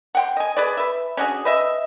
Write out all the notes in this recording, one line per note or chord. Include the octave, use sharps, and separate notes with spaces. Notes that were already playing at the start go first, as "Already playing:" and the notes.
F#5 G5 C6
D#5 G#5
G#4 B4 D5
B4 E5
C#4 D4 F#4 G#4
B4 D#5 E5